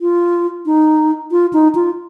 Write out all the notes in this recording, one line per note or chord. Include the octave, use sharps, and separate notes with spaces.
F4
D#4
F4
D#4
F4